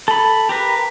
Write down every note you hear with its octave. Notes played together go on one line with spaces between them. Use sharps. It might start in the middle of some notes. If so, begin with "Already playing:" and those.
A4 B5
G4 A#4 B4